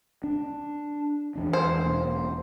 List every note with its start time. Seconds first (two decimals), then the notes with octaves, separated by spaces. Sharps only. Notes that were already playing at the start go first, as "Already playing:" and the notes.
0.24 D4
1.35 E2 E3 D4
1.53 C5
1.85 E1 A#3